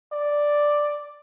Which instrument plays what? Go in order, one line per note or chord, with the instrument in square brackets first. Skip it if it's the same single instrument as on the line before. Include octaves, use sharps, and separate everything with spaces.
[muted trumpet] D5